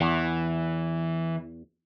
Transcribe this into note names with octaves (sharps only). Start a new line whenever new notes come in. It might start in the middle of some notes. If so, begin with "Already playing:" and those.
E2 E3